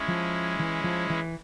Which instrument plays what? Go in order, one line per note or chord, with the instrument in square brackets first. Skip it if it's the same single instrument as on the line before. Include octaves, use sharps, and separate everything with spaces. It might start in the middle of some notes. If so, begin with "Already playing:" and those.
Already playing: [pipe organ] G#3 C#4 E4
[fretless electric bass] F3
E3
F3
E3